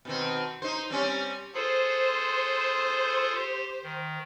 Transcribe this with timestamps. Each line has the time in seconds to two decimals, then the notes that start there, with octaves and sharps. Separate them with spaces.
0.05 B2 D#3 C4
0.62 D#4 C5
0.90 G3 C4 C#4
1.55 F4 G#4 A4 C5
3.35 G4
3.83 D#3